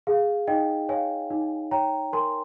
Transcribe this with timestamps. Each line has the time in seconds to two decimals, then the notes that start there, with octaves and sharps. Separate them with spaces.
0.07 G#4 F5
0.47 D#4 D#5 G5
0.89 C#5 F5 G#5
1.30 D#4
1.71 C#5 G5 A#5
2.13 A#4 G#5 C6